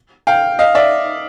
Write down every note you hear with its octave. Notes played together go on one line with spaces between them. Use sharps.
F5 G5
D#5 F5
D5 E5